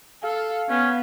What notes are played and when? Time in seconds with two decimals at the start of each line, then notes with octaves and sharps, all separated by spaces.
0.23 A4 F5
0.70 B3 C#4